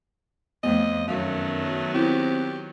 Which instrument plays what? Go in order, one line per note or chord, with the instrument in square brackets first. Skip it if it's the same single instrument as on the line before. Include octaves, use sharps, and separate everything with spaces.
[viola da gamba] F2 [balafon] A3 B3 [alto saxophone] D#5
[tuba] F#2 [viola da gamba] D#3 F#3 B3 [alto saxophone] A3 [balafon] F#4 F5
[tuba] C4 [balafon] E4 [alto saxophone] G4